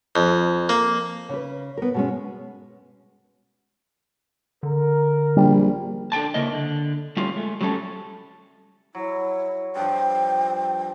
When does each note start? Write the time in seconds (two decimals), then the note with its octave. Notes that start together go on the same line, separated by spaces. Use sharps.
0.16 F2
0.69 A#3
1.29 C#3 B4
1.77 B3 A#4
1.94 B2 G#3 C#4
4.63 D3 A#4
5.37 A#1 G3
6.12 D4 A4 G5 A5
6.34 C#3 A#3 E4 A#4 D#5
6.52 D3
7.17 G3 A3 C#4 E4 F4
7.36 G#3 A3
7.61 F#3 G3 A3 C#4 A4
8.95 F#3 E4
9.75 G2 F3 G5